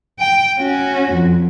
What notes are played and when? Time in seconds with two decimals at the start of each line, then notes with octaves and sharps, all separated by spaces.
0.20 G5
0.58 C#4 F#4
1.13 F2